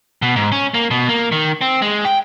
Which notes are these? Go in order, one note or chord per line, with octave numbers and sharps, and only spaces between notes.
B2
G#2
C#4
A#3
B2
A#3
D#3
C4
G#3
G5